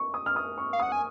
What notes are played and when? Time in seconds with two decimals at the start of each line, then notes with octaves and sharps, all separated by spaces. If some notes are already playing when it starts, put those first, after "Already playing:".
Already playing: C#6
0.14 D#6
0.26 F6
0.36 D#6
0.58 C#6
0.73 F5
0.80 F#5 D#6
0.92 G#5